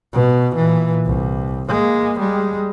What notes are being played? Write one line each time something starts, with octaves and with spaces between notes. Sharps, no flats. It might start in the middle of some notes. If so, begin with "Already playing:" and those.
B2
A#2 E3
C2
G#3 A#3
G3 G#3